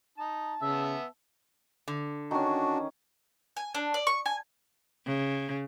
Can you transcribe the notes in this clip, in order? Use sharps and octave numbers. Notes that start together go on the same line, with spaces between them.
D#4 A5
C#3 B3 E5 E6
D3
D#3 C#4 D4 F#4
G#5
D4
D5
C#6
G#5
C#3